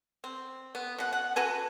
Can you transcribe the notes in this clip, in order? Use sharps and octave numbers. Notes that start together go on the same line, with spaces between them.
C4
B3
B2 F#5
F#5
F#4 A4 B4 G#5